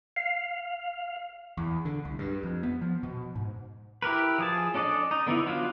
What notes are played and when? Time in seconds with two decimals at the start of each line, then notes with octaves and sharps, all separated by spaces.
0.16 F5
1.57 E2
1.85 D3
2.05 C2
2.19 G2
2.43 F2
2.63 B3
2.81 F3
3.03 B2
3.35 G#2
4.02 E4 G4 A#4 B4
4.39 F3 G#4 A5
4.74 C#4 D4 A4 D5 D#5
5.11 D#4
5.27 D3 B3 D#4 E4
5.47 F#3 B3 D4 F4 F5